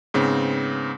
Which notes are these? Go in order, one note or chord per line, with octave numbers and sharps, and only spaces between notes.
G#2 C#3 B3 C4